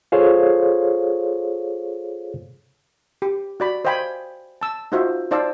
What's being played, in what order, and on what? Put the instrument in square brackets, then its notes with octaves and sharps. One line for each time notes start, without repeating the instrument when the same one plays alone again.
[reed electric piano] F4 G#4 A4 C5 C#5 F5
[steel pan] G4
F#4 D5 B5
C5 D#5 F5 G5 G#5 B5
A5 E6
D#4 F4 F#4 C5 D#5 E5
D#4 C5 D5 F5 A5 E6